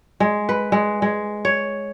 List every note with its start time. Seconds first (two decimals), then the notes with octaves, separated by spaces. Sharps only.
0.20 G#3
0.49 B4
0.72 G#3
1.02 G#3
1.45 C#5